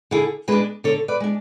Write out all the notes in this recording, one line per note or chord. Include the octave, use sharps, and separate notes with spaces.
D3 E4 G#4
G#3 D4 G#4 B4
D3 A4 C#5
B4 D5
G#3 D4